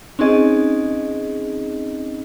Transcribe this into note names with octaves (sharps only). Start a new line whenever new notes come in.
C4 C#4 D#4 G#4 D#5